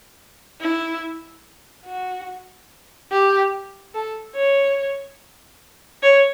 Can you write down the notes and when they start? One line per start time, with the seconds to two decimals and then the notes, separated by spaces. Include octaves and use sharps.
0.61 E4
1.86 F#4
3.11 G4
3.94 A4
4.35 C#5
6.03 C#5